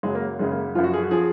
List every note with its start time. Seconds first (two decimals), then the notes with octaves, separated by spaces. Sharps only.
0.03 F#2 C#3 F#3 G#3
0.15 A#3
0.39 F#2 C#3 F#3 G#3
0.51 A#3
0.75 F#2 F3 F4
0.84 F#4
0.93 G#4
1.03 F#4
1.11 F3 G#4